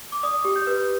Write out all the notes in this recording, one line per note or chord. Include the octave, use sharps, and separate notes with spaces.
D6
D5 D#6
G4
G6
B4